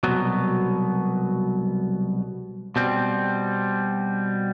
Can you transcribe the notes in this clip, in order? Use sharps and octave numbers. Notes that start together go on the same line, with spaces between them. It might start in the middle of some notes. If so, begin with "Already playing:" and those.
C2 B2 F#3 B3
B2 G3 C4